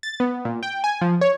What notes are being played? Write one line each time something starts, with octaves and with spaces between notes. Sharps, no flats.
A6
B3
A#2
G5
G#5
F3
C#5